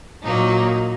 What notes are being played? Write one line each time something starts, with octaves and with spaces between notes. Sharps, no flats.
A#2 F#3 A#3 D#4